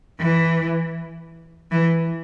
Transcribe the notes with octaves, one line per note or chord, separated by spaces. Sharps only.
E3
E3